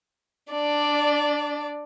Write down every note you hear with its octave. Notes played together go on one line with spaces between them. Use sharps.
D4 D5